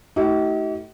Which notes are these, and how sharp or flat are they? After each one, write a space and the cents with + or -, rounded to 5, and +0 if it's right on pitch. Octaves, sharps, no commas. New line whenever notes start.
A3 +0 D#4 +45 G4 -45